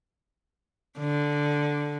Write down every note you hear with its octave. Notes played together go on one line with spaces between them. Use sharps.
D3